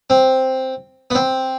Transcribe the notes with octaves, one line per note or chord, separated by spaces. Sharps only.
C4
B3
C4